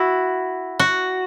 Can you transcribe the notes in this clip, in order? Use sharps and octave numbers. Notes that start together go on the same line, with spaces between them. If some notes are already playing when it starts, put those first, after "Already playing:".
Already playing: E4 F#4
F#4